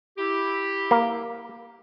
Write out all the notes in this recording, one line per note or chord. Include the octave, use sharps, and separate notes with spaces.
E4 G4
A#3